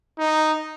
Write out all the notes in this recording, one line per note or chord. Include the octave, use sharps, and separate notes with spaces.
D#4